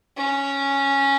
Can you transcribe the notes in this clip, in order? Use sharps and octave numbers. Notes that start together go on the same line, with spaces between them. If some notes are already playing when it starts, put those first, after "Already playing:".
C#4